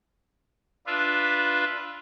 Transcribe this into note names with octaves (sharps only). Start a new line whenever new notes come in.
D4 F4 B4 E5